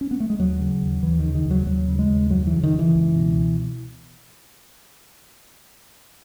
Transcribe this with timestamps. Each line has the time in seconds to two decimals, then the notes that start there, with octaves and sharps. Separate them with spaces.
0.01 C#4
0.11 B3
0.20 A3
0.30 G#3
0.39 D#2 F#3
0.61 C#3
0.82 D#2
1.03 D#2 E3
1.19 D#3
1.24 C#3
1.35 D#3
1.46 D#2
1.51 F#3
1.66 D#2 F#3
1.88 C#3
1.99 G#3
2.10 D#2
2.30 F#2 F#3
2.47 E3
2.52 C#3
2.63 D#3
2.74 F#2
2.79 E3
2.95 C#2
3.16 B2